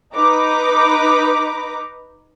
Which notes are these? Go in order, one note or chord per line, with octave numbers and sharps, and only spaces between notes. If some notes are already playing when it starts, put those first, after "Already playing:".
D#4 B4 A#5 D6